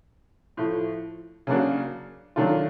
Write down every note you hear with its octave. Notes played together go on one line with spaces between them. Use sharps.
A2 F3 A3
C#3 F#3 A#3 D4 F#4
D#3 F#3 A3 D4 F4